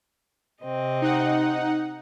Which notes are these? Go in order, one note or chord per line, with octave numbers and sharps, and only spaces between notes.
C3 C4 D#5
D#4 F#5